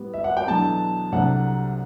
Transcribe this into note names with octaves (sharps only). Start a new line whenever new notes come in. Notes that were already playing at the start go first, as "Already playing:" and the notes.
Already playing: A2 G3 B3
E5
F#5
G5
E2 B2 F#3 A3 D4 A5
C2 C3 F#3 A3 D4 F#5